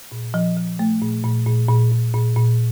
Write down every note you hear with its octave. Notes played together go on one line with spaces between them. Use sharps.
A#2
F3
F3
A3
A#2
A#2
A#2
A#2
A#2
A#2
A#2